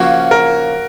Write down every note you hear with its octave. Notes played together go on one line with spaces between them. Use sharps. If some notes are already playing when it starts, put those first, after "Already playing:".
Already playing: C#3 F3 A#3 C#4 F#4
A#4